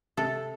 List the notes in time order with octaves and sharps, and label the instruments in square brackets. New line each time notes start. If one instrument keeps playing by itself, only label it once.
[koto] C3 A4